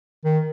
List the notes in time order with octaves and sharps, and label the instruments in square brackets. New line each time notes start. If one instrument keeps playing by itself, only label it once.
[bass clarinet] D#3